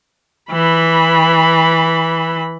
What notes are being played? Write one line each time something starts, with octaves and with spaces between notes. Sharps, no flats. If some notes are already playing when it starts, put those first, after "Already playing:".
E3 B5